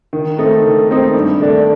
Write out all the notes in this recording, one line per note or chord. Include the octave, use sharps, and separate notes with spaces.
D#3
A3 C4 D#4
D#3
A3 C4 D#4
G2
D#3 A3 D4